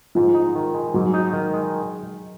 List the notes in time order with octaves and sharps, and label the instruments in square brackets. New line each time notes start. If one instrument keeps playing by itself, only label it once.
[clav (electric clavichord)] G#2 [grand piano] F3
[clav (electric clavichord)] D#4
D#3
G#3
[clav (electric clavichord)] G#2 [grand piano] F#3
[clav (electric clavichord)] D#4
D#3
G#3